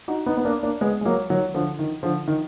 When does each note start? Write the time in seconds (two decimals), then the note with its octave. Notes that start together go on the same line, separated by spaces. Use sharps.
0.08 D#4 F#4
0.26 B3 D#4
0.37 B3
0.45 A#3 D4
0.63 A#3 D4
0.81 G#3 B3
1.01 G#3
1.05 F#3 A#3
1.30 D#3 F#3
1.54 D3 F3
1.79 D#3
2.03 D3 F3
2.28 D#3